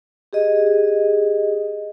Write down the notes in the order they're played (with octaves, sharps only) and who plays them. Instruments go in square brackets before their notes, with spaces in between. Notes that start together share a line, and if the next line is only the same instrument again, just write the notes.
[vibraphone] G4 G#4 D#5